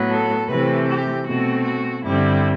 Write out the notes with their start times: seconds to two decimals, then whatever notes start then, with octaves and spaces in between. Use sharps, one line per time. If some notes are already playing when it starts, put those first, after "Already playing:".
Already playing: A2 F#3 B3
0.10 A4
0.49 C3 E3 A3 C4 B4
0.87 G4
1.26 B2 A3 C4 F#4
1.64 F#4
2.03 G2 D3 G3 C4 E4